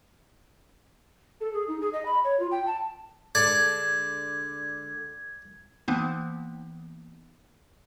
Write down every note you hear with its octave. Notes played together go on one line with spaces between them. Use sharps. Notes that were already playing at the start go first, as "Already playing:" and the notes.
A4
G#4
D#4
G#4
D#5
B5
C#5
F4
G5
A5
D3 G#3 A4 D5 G#6
E3 A#3 B3 D#4